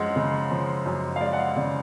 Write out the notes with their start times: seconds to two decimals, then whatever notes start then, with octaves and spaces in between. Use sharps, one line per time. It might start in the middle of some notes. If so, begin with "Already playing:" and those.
Already playing: F#2 F3 G#3 F#5
0.16 C#3
0.51 F3
0.86 F#2
1.16 F5
1.21 G#3 D5
1.33 F#5
1.39 F5
1.56 C#3 D5